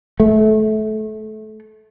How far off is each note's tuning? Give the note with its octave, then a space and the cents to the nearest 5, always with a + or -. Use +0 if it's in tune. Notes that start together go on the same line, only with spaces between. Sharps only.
A3 -25